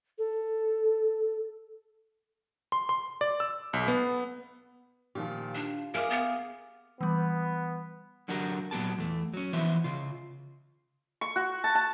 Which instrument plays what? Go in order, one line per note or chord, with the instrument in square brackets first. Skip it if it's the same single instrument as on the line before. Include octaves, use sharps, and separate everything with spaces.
[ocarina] A4
[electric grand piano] C6
C6
D5
E6
B1
B3
[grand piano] A#2 D#3 F3 [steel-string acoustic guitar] G4
[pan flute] D4 [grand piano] F4
[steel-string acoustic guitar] G#4 [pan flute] A#4 [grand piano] E5 D6 [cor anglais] F5
[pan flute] B3
[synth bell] E3 G3 [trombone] B3
[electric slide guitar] D3 F#3 D4 F#4 G4 A#4
A#2 F#3 B3 G4 A5
E2 A3
F#3 C#4
E3 F3 B3 C5 E5
C#3 F4
[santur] C#6
F#4
A5
A5